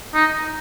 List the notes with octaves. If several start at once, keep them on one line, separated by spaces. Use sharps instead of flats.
D#4